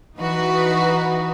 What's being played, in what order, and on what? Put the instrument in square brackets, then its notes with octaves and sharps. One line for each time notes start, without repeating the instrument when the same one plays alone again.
[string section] E3 D#4 F#4 B4